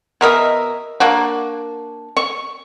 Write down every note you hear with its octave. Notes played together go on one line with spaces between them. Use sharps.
B2 A#4 D#5 E5
A#3 D4 F#4
C#6